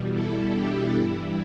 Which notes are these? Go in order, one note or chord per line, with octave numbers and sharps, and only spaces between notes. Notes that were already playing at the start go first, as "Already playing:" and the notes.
Already playing: E2 B2 G3
E4 A4
D4 G4
G2 E3 G3 E4